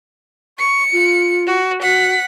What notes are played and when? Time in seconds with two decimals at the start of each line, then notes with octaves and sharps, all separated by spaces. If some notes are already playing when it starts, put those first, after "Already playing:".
0.59 C#6 C#7
0.92 F4
1.47 F#4
1.82 F#4 F#5 B6